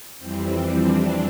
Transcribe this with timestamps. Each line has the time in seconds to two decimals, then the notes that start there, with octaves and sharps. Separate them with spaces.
0.18 F2 E3 G3 C4
0.48 C4
0.78 D4